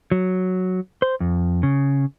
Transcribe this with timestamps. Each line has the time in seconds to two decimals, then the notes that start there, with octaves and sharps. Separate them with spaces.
0.12 F#3
1.02 C5
1.20 F2
1.63 C#3